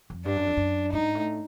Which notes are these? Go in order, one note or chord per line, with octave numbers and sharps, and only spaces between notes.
F2
G2 D4
F#2
F2
F#2
G#2 D#4
A2